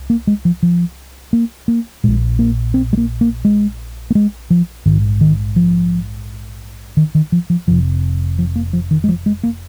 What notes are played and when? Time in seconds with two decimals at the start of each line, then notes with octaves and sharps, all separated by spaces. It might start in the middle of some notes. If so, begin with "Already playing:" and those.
Already playing: C2
0.10 A#3
0.27 G#3
0.45 F3
0.63 F3
1.33 A#3
1.68 A#3
2.04 A#1 A#2 G#3
2.39 A#3
2.74 C4
2.93 G#3
2.97 A#3
3.21 A#3
3.45 G#3
4.10 A#3
4.15 G#3
4.50 F3
4.86 A#1 G#2 D#3
5.21 D#3
5.56 F3
6.97 D#3
7.15 D#3
7.32 F3
7.50 F3
7.67 F1 F2 C3 F3
8.38 F3
8.56 A#3
8.73 F3
8.91 D#3
9.04 G#3
9.08 F3
9.26 G#3
9.43 A#3